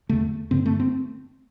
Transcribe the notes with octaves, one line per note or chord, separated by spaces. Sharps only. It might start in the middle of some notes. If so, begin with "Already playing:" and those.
E2 D3 A3
G2 D3 C4
A3
C4